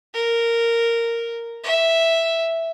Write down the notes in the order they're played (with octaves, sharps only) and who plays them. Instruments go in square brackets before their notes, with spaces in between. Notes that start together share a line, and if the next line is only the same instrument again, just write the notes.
[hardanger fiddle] A#4
E5